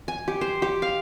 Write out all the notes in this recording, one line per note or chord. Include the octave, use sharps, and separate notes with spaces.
G#5
G4
C5
G4
F5